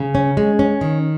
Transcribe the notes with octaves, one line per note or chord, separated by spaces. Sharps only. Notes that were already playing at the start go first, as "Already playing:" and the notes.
Already playing: C#3
C#4
G#3
C#4
D#3